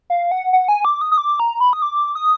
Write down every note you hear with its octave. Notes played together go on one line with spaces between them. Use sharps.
F5
F#5
F#5
G#5
D6
D#6
D#6
D6
A#5
B5
D#6
D6
D#6